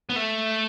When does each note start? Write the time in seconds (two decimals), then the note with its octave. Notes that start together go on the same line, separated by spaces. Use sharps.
0.09 B3
0.16 A3